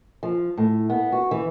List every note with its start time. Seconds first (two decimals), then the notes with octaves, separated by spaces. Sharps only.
0.23 F3
0.57 A2
0.90 B3
1.12 F#4
1.31 E3